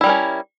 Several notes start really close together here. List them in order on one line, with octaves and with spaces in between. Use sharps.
E4 G3 A#4 C#4